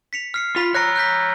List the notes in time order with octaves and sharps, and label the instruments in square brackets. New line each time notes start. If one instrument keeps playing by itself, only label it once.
[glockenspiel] B6 C#7 F7
F6 C7 C#7
[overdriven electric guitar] F4 [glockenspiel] B5 B6 F7
[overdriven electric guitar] C#5 A#5 [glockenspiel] F#6 A#6 C#7
[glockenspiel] F#6 G6 B6